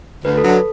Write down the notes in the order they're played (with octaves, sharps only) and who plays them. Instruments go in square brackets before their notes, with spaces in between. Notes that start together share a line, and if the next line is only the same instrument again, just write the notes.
[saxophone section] D2 [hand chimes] B4
[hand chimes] A4
[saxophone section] D3 F#3